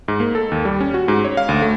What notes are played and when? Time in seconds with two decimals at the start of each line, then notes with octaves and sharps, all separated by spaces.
0.08 G#2
0.20 A#3
0.35 A4
0.52 D#2
0.65 G3
0.80 C#4
0.94 F#4
1.08 G#2
1.25 C#5
1.37 F5
1.49 D2
1.62 A3